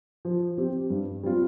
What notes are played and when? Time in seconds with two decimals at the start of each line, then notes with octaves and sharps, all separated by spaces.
0.25 F3
0.58 C4 G4
0.90 G2
1.23 G3 C4 F4